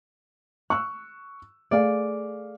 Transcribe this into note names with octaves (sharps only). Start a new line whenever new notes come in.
C#6 E6 F#6
A3 G#4 D5 F5